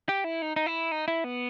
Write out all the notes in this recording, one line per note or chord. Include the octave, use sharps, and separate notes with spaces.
G4
E4
D#4
D#4
E4
D#4
E4
B3